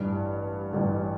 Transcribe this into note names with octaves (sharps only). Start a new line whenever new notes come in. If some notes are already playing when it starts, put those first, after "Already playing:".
Already playing: A1 G2 E3
A1 G2 E3